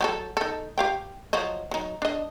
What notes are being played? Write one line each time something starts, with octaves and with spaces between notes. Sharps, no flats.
F#3 G4 A4
D#4 A4
G4 F5 G5
F3 F#3 D#5
F#3 D#4
D4 D#5